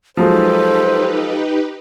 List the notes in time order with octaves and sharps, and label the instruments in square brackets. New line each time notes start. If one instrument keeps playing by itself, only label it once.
[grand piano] F3 F#3 G#3 [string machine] D#4 G4 B4 [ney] A4 [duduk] C5